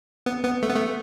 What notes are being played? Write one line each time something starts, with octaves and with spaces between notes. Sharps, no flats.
B3
B3
A3
B3
A3